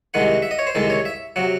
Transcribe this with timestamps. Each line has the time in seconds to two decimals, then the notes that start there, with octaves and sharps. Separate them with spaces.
0.14 C2 C3 D#3 G#3 F#5
0.42 E5
0.51 D#5
0.59 C#5
0.67 C5
0.75 C2 C3 D#3 G#3 A4
0.90 C#5
1.05 E5
1.36 C3 F#3 F#5